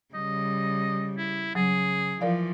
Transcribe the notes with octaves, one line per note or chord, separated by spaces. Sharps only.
C#3 G3 D#5
E4
C#3 F#3 G#4
E3 F3 A#4 D5 F5